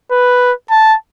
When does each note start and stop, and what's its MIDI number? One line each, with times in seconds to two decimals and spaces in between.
0.11 0.52 71
0.70 0.95 81